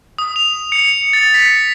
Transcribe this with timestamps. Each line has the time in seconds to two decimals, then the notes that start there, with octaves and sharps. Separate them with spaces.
0.18 D#6
0.36 F7
0.72 C#7
1.13 A6
1.34 B6